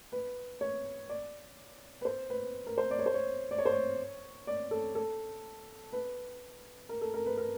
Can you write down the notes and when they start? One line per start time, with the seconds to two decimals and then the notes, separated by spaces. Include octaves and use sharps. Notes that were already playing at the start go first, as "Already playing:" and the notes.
0.12 B4
0.61 C#5
1.09 D5
2.01 B4
2.05 C5
2.30 B4
2.67 A#4
2.78 C5
2.91 D5
2.99 C#5
3.06 C5
3.14 C#5
3.51 D5
3.58 C#5
3.66 C5
3.72 C#5
4.47 D5
4.71 A4
4.95 A4
5.92 B4
6.89 A#4
7.01 A4
7.14 A#4
7.26 B4
7.37 A#4